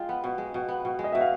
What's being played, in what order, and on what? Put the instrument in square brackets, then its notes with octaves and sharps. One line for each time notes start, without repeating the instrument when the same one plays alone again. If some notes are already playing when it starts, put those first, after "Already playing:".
Already playing: [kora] G#3 F4 [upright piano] F5 G5
[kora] B3
B2
G#3
B2
B3
B2
G#3
[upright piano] D#5
[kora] B2 [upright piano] E5
[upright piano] F5